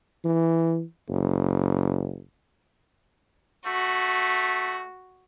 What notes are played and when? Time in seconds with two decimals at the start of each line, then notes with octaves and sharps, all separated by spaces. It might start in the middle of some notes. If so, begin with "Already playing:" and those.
0.24 E3
1.08 F#1
3.67 A3 F#4